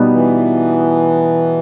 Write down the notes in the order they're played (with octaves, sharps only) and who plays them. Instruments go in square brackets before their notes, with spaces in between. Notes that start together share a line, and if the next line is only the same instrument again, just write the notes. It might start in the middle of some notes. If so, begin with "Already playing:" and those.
Already playing: [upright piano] B2 G3 B3 D#4 F#4
[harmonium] E3